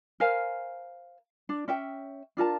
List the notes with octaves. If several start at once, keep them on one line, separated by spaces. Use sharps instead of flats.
A#4 C5 F5 G#5
D4
C#4 E5 G5
D4 F4 A#4 A5